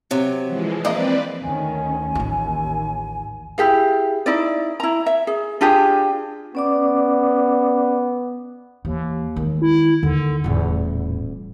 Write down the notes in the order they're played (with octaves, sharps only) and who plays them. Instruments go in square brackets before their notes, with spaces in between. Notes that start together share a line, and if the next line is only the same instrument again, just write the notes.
[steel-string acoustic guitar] C3 F#3
[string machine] E3 F3 G#3
[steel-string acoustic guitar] A#3 [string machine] C4 B4 D5 [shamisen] D4 E4 D#5
[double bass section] D2 D#3 C#4 [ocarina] G#5
[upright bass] A1 F4 [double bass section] D#2
[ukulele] E4 G4 G#4 F5
D#4 E4 D5
E4 A#5
E5
G#4
D4 F4 G4 G#4
[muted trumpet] B3 [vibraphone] C#4 D5 D6
[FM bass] D#2 [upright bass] E3
[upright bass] D#3 G#3
[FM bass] E4
[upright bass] D#2 [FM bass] D3
[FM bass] D#1 [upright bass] E2 A2